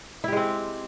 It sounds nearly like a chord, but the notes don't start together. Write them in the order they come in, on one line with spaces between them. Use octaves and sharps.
E4 G4 G#3 C4